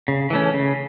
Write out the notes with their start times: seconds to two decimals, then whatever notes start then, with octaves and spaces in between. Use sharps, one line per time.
0.08 C#3
0.30 E3 A3 C#4
0.54 C#3